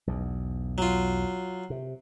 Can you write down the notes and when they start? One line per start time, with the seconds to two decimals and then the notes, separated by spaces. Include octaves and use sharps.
0.07 B1 E2
0.78 F#3 F4
1.70 C3